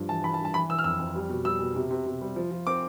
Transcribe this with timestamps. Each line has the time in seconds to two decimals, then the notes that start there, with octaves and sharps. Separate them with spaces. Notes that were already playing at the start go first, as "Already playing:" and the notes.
Already playing: G2 F3
0.09 E3 A5
0.24 E3 B5
0.34 A5
0.40 G2
0.45 A5
0.54 E3 B5
0.69 E3 E6
0.79 F6
0.84 F2 E6
0.99 F2
1.16 G3
1.30 B2
1.45 G3 E6
1.60 B2
1.76 C3
1.91 C3
2.06 C3
2.21 G3
2.36 F3
2.51 F3
2.67 C4 D6